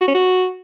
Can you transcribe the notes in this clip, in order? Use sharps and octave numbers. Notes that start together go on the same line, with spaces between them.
F#4
C#4
F#4